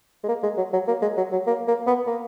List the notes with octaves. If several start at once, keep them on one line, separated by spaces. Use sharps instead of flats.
G#3
A#3
G#3
F#3
F#3
A#3
G#3
F#3
F#3
A#3
A#3
B3
A#3